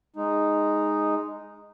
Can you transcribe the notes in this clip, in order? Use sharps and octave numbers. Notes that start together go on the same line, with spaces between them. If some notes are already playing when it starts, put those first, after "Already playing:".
G#3 D#4